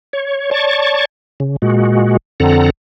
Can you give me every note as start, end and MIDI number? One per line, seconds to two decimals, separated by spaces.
0.13 0.51 73
0.51 1.05 73
0.51 1.05 74
0.51 1.05 81
0.51 1.05 85
1.40 1.56 49
1.62 2.17 46
1.62 2.17 56
1.62 2.17 66
2.40 2.70 41
2.40 2.70 50
2.40 2.70 60
2.40 2.70 69
2.40 2.70 78
2.40 2.70 82